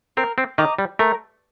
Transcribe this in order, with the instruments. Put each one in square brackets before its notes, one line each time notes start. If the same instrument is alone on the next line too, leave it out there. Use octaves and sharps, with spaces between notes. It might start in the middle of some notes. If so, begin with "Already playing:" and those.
[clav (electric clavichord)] C4 [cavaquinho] A#4
[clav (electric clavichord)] C4
[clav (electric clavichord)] D#3 [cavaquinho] D#5 A#5 D6
[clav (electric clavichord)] G3
[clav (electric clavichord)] A3 [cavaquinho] A#4